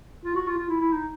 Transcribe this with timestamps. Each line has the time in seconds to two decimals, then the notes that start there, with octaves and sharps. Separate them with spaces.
0.25 F4
0.35 F#4
0.47 F4
0.58 F4
0.69 E4
0.80 E4
0.92 D#4